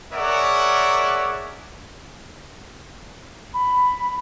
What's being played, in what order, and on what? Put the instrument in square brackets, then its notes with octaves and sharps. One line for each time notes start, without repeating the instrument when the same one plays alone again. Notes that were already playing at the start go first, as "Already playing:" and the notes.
[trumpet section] G#4 A#4 C#5 D5 E5 F#5
[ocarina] B5